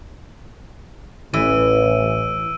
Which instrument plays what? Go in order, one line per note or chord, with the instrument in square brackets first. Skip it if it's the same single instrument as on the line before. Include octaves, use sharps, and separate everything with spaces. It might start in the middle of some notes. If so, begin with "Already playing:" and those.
[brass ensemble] A1 [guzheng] E3 [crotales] E6 D7 D#7